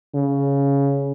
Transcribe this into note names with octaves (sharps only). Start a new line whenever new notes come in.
C#3